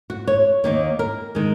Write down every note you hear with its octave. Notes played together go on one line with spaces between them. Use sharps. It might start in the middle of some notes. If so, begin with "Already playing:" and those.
F#4
C#5
D#2 D#3 A#3
A#4
D#3 G#3